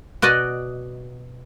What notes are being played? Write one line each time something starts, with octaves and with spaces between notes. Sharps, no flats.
B2 F#4 D5 D#5